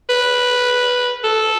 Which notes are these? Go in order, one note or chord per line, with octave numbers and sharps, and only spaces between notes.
B4
A4